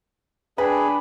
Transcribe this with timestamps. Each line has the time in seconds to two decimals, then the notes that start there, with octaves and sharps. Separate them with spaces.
0.58 D4 G#4 B4 G5 G#5 B5